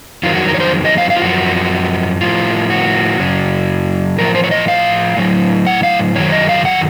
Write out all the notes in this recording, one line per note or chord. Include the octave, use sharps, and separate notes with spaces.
F2 D#3 F#3 F4
F#4
A#4
C#5
C5
D#5
F5
F5
F4
F#2 F3 F#4
A2 F3 F4
F#4
F#2 C#3 F#3
A2 F3 A#4
C5
C#5
D#5
F5
A2 F#3
F#5
F5
F#2 D#3 F#3 C#5
D#5
F5
F#5